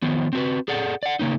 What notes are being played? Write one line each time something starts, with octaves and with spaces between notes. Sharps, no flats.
D#3 F3 B3
C4 F#4 B4
G#4 A4 D5 F#5
D5 F#5
C#3 A#3 C#4 D#4